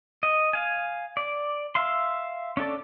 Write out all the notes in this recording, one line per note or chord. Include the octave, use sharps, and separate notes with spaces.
D#5
F5 G#5
D5
E5 F5 C6
C#4 D4 A4 D5